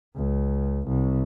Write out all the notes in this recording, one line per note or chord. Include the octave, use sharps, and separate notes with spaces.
C#2
C2